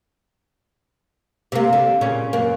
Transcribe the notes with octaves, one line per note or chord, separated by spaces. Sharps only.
C3 A#3
D3
A#2 C#3 C#4
F#2 A#3